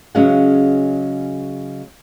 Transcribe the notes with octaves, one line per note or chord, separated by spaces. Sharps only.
C#3 F#3 G#3 C#4 F5 F#5